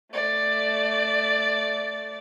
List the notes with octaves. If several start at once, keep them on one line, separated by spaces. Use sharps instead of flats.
A3 D5